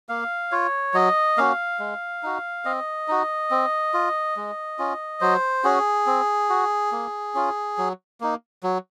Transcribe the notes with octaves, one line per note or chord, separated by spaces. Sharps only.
A#3 F5
F4 C#5
F#3 D#5
A#3 C#4 F#4 F5
G#3
D#4 F#4
C4 D#5
D#4 F#4
C4
F4
G#3
C#4 F4
F#3 C5
C#4 F#4 G#4
C4
F#4
A#3
C#4 F4
F#3
A#3 D#4
F#3